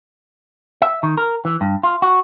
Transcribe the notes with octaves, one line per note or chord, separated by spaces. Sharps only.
E5
D#3
A#4
E3
G2
F4
F#4